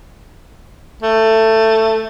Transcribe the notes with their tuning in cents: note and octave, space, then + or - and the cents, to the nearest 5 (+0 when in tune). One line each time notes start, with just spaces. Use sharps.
A3 +15